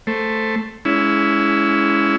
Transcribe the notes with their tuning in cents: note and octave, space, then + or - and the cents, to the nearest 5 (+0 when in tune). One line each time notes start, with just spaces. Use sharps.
A3 +5 C5 +0
G#3 +10 C#4 +30 E4 +0